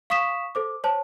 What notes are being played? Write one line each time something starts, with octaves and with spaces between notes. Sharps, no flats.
F5 C#6 D#6 B6 E7
A4 C5 D6
C5 C#5 A5